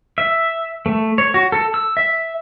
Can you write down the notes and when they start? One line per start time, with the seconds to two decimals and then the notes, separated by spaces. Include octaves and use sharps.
0.18 E5
0.86 A3
1.18 C#5
1.34 F#4
1.52 A4
1.74 E6
1.97 E5